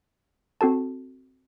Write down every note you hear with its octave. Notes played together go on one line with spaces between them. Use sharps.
C4 F#4 A4 A5